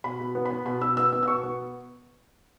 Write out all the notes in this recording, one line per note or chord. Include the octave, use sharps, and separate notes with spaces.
B2 B5
B2
B3
B3 B5
B2 B5
B2 E6
B3 E6
B3 E6
E6
B2 C#6
B3